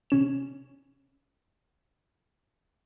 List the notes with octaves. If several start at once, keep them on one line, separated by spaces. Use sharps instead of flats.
C3 C#4 E7